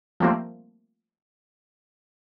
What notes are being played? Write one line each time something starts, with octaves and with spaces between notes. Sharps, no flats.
F3 G3 A3 A#3 C4